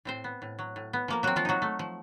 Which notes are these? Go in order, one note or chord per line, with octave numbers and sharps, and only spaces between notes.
A2 C4 C5
B3
A2
F#3
A2
B3
F3 A#3 A#4
F#3 C4 F#4
F3 F4
F#3 D#4 F#4
A3
F3